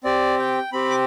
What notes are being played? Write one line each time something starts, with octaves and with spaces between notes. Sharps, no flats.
C4 G4 D5
G5
C4 G4 B5
D6